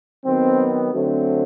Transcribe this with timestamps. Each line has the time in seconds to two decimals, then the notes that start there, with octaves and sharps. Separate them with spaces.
0.25 D#3 F#3 B3 C4
0.93 D3 F#3 A3 C4